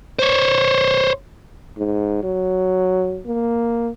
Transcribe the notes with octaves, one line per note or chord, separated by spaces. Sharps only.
C5 C#5
G#2
F#3
A#3